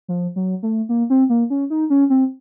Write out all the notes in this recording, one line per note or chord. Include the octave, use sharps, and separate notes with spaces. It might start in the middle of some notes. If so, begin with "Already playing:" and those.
F3
F#3
A3
A#3
C4
A#3
C#4
D#4
C#4
C4